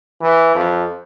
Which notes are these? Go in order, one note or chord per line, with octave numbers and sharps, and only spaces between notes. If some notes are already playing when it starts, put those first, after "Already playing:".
E3
F2